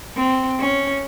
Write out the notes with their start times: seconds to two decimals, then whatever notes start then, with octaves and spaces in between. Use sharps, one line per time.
0.17 C4
0.60 C#4